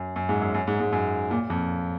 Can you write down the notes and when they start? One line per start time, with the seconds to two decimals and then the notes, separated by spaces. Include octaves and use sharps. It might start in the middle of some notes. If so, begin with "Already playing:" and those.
Already playing: F#2
0.16 F#2
0.29 G#2
0.42 F#2
0.54 F#2
0.67 G#2
0.80 G#2
0.92 F#2
1.31 A#2
1.50 F2